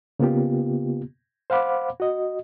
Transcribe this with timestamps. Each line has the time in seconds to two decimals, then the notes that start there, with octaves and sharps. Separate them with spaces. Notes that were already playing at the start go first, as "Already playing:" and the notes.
0.19 C#3 A#3 B3 F4 G4
1.50 C5 F5 F#5 B5 D6
2.00 F#4 D#5